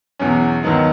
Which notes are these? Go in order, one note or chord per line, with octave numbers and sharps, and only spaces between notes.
E2 B2 F#3 C#4
D#2 D#3 F#3 B3 D#4